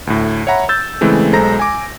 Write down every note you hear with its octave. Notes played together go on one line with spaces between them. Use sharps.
D2 A2
C#5 E5 F#5 A#5 B5
E6 G6 A6
C#3 E3 G#3 A3 C4
B1 G#3 A4 C5 A#5 A#6
G#5 D6